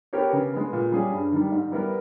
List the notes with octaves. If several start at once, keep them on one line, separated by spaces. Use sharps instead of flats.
B3 G4 A#4 C#5
C#3
G#3 B3
A#2
G3 C#4 G#4
G2
D#3 G3
G#2
G3 B3 E4 A#4